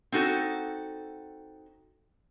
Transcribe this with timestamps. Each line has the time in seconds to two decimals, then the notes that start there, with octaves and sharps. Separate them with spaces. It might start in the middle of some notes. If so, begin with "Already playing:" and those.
0.12 C4 D#4 F#4 A4